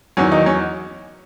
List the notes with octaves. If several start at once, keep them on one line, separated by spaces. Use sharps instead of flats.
E2 D#3 F#3 C#4
D#3 D#4
C#4